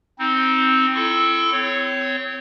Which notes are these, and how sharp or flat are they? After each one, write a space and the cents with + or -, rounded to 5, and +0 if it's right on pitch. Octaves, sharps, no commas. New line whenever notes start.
C4 +0 D#4 +20
E4 +35 A4 -10 C#6 +0
C4 -20 C#5 +0